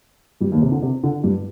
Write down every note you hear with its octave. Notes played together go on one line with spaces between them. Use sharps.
G2 G3
D#2 D#3
C3
D3
C3
D3
G2 G3